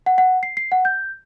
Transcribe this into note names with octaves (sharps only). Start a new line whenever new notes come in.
F#5
F#5
C7
C7
F#5
G6